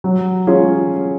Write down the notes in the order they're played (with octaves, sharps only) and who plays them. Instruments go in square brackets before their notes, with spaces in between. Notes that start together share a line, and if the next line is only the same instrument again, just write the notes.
[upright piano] F#3
C#4 F4 G#4